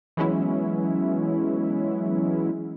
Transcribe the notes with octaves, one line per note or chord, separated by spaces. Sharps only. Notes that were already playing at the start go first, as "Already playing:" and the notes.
E3 F#3 G#3 B3 C#4 E4